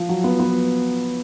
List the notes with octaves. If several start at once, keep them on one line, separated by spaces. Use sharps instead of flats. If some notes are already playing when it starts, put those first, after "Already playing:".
Already playing: F3
F#3
B3
B3